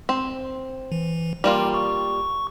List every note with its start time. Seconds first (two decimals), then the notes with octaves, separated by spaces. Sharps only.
0.09 C4
0.92 E3
1.44 G3 A#3 F4 G5
1.74 C#6